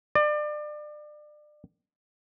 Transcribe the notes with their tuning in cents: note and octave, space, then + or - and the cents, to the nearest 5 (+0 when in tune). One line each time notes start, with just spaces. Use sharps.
D5 +30